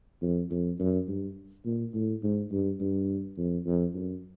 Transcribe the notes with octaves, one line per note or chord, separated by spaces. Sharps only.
F2
F2
F#2
G2
A#2
A2
G#2
G2
G2
F2
F2
F#2